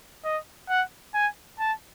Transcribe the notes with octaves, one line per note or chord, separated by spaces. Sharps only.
D#5
F#5
G#5
A5